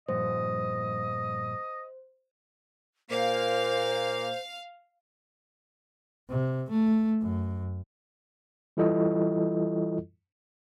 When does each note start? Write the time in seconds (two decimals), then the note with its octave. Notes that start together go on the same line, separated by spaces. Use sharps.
0.09 G2 A#2 F3 C5 D#5
3.11 A#2 A#3 C5 F5
6.29 C3
6.70 A3
7.21 F#2
8.77 E3 G3 E4 F4 A4 D#5